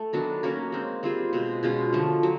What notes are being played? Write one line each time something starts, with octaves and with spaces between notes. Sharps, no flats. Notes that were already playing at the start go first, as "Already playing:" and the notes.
Already playing: A3 A4
D#3 F#3 B3 D4
A#3 C#4 F#4 A#4
G#3 C4 D#4
G3 C4 F4 G#4
B2 G#3 C4
B2 G#3 C#4 F4
D3 F3 A3
F#3